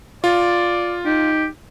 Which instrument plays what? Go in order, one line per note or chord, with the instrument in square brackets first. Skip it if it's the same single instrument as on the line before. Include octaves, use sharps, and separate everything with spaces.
[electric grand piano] F4 [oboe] D5
[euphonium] D#4 [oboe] G4